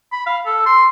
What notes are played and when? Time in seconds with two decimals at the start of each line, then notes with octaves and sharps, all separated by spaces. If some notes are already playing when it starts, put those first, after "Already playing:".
0.12 B5
0.27 F5
0.46 A4
0.66 C6